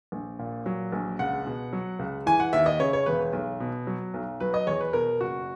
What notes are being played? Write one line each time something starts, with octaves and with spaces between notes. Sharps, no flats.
A#1
A#2
F#3
A#1
C#2 F#5
B2
F#3
C#2
E3 G#5
F#5
D#2 E5
D#5
C#3 C#5
C#5
E1 B4
B1
B2
F#3
B1
F#3 B4
D#5
E2 C#5
B4
B2 A#4
F#1 F#4